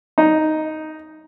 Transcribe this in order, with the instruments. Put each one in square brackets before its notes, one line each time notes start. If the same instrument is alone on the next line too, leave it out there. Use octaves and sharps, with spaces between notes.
[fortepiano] D#4